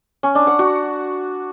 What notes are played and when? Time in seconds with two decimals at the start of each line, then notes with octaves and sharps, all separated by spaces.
0.23 C#4
0.35 D4
0.47 F#5
0.59 F#4